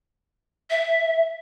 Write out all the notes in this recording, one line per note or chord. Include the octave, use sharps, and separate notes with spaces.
E5